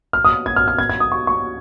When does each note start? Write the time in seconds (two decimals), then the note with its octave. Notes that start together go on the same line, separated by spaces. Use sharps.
0.13 F6
0.24 D#6
0.46 G#6
0.56 F6
0.68 F6
0.78 G#6
0.90 G#6
1.00 D#6
1.12 C#6
1.27 C#6